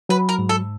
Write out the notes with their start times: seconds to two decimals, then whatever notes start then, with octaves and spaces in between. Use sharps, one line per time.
0.09 F#3 B4
0.29 A#4
0.39 G#2
0.49 A4